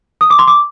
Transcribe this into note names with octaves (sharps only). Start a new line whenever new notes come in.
D#6
D6
C6
D6